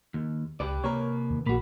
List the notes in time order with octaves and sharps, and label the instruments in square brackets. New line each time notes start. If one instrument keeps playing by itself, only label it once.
[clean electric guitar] D#2
[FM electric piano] C#2 [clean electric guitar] G4 B4 D5
[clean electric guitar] C3 A#3 B4 [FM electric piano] A#4 C#5
[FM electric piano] D#2
[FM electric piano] A#1 B5 [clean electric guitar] A#3 F#4